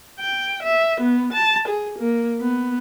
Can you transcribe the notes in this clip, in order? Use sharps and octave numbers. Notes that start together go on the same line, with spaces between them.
G5
E5
B3
A5
G#4
A#3
B3